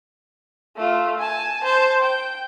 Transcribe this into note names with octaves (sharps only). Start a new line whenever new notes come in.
A3 F4
G#5 A5
C5 A5
G5